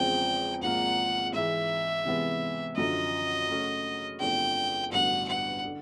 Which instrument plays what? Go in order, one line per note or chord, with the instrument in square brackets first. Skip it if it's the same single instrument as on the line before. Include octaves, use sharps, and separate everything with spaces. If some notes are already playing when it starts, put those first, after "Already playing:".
Already playing: [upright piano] E2 C#3 F3 G#3 C4 [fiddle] G5
[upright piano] G#1 G#2 F3 A#3 [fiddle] F#5
[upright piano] G#2 E3 G#3 [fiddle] E5
[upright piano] C3 E3 G#3 B3
[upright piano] F#2 D3 F3 [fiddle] D#5
[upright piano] C#3 F#3 A3 C#4 F#4
[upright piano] E2 C3 F3 A3 D4 [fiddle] G5
[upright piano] A1 G2 D3 F#3 B3 [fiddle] F#5
[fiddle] F#5
[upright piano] D3